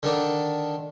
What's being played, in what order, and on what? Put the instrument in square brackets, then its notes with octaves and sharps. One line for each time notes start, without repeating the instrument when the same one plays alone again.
[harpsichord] D3 D#3 D4